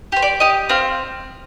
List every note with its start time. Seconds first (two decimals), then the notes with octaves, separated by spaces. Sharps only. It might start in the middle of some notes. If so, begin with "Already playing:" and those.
0.12 G4 C5
0.22 D5
0.40 G4 D#5
0.69 C4 F5